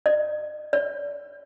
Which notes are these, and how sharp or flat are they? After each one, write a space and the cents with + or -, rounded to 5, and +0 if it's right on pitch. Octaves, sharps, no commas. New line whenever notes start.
D5 +45
D5 -25